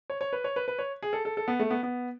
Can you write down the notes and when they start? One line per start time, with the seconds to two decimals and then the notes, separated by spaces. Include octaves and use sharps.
0.10 C#5
0.21 C#5
0.33 B4
0.44 C#5
0.56 B4
0.68 B4
0.79 C#5
1.03 G#4
1.13 A4
1.25 A4
1.37 A4
1.48 B3
1.60 A3
1.70 B3
1.83 B3